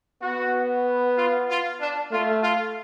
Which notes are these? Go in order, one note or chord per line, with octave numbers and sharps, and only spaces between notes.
B3 F#4
F4
F4
D4
A3 F4
F4